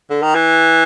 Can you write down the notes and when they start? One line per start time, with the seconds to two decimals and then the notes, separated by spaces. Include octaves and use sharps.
0.10 D3
0.22 D#3
0.35 E3